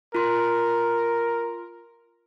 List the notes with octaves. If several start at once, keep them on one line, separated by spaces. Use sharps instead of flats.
F4 A#4 C6